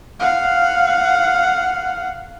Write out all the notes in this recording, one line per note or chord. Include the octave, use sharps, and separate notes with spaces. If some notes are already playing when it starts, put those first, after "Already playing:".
F5 F#5